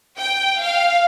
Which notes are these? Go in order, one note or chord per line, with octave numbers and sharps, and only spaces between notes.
G5
F5